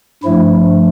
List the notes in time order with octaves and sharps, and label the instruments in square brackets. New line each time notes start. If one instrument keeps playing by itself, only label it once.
[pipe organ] G2 F3 A3 E4